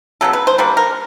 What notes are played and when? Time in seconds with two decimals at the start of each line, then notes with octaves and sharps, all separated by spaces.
0.21 C#3 F#3 B3 A4
0.33 B4
0.47 C5
0.58 D3 G3 A#3 B4
0.77 A#4